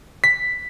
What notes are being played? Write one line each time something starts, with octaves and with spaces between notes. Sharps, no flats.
B6